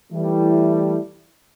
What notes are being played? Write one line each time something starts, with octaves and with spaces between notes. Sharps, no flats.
E3 G3 A3 E4